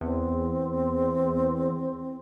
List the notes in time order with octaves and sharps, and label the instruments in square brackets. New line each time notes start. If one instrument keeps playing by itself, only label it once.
[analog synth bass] E2 [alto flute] C4